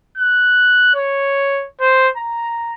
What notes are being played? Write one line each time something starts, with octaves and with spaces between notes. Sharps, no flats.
F#6
C#5
C5
A#5